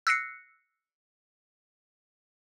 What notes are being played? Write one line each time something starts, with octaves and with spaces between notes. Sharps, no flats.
E6 F#6 A#6 C7 C#7